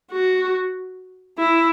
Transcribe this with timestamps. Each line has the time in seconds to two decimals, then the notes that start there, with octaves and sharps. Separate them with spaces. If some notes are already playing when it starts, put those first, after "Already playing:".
0.12 F#4
1.38 E4